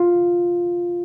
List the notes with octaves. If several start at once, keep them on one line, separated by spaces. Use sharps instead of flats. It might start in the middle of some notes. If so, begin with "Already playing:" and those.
Already playing: F4